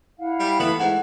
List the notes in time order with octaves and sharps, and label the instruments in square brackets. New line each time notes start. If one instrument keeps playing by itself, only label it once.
[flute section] E4 F5 F#5
[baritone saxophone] G3
[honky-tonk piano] E3 A3 E7 [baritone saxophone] B3
[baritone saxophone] G#2 [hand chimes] F#5